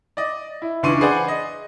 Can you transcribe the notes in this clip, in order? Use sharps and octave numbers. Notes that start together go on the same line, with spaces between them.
D5 D#5
E4
C#2 E3 D4 C6 C#6 D#7
G#4 B4 C5 D5 F#5
D#5